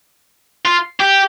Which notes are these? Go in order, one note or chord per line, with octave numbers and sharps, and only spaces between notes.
F4
G4